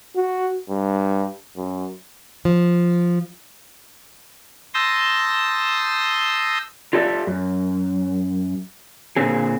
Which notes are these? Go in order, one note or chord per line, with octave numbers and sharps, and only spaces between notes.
F#4
G2
F#2
F3
A5 C6 D#6 E6 G6 A#6
F4 G4 A4 D5 E5
F#2
A#2 D3 C4 G#4